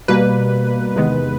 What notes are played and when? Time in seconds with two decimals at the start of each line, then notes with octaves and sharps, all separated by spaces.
0.08 B2 G3 A#3 B4
0.96 E2 C3 D#3 G#3 B3